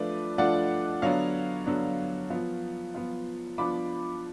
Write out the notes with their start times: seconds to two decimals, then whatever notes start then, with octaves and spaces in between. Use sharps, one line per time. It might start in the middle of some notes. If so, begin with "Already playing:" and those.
Already playing: F3 A3 D4 F4 B4 D5
0.38 F3 A3 D4 F4 D5 F#5
1.02 D3 F#3 B3 D4 C#5 F5
1.66 D3 F#3 B3 D4
2.30 F3 B3 F4
2.94 F3 B3 F4
3.58 F3 B3 D4 F4 B5 D6